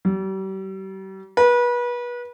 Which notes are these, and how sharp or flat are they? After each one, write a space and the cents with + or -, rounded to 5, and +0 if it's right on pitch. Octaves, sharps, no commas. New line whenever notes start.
G3 -40
B4 -30